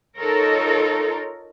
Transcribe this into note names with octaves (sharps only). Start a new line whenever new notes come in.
D#4 F4 A4 A#4 C#5